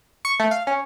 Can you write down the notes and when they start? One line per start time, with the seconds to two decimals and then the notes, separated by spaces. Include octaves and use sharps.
0.25 C#6
0.40 A3
0.51 F5
0.67 C#4